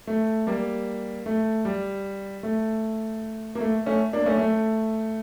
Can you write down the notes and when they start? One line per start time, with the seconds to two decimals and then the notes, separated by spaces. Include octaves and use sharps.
0.07 A3
0.47 G3 A#3
1.26 A3
1.65 G3
2.43 A3
3.55 A#3
3.61 A3
3.86 A3 C#4
4.13 A#3 D4
4.26 A3 C#4
4.39 A3